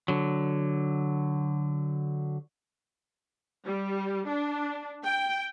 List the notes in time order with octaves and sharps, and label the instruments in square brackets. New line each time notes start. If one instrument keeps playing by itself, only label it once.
[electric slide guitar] D3 F#3
[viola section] G3
D4
G5